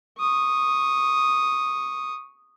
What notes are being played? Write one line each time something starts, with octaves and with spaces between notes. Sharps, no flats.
C#6 D#6